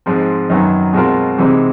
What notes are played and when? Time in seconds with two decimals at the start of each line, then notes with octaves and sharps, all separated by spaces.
0.06 G#2 F3 G#3 C4
0.50 F#2 D#3 F#3 B3
0.93 B2 G#3 C4 F4 A#4
1.38 C3 E3 G#3 C4 D#4